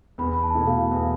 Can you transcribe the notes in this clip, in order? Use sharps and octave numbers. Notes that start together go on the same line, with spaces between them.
E2 B5
A5
B2 A3 E4
F5
E2 F5